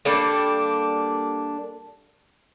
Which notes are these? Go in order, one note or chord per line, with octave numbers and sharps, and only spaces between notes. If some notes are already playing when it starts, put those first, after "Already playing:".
G3 A#3 D4 A4